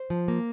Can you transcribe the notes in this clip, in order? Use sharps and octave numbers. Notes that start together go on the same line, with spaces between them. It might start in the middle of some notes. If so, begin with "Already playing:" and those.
Already playing: C5
F3
A#3